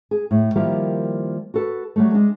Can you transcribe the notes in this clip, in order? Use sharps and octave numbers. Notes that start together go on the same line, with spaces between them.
G#4
A2
D#3 F3 G3 A#3 E4 G4
F#4 A4 B4
F#3 G3 A3
G#3 D4